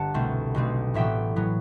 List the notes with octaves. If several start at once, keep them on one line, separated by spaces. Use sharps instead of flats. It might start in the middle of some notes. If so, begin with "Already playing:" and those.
Already playing: G1 F#5 A5
C2 B2 A3 C4
B1 B2 A3 C4
A1 A2 F#3 B3 E5 G5
A2 F#3 B3